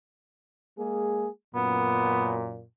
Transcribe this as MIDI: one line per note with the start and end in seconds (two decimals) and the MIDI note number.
0.79 1.29 56
0.79 1.29 58
0.79 1.29 68
1.55 2.65 42
1.55 2.65 46
1.55 2.33 59